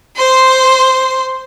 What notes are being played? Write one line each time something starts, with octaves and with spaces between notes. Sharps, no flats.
C5 C6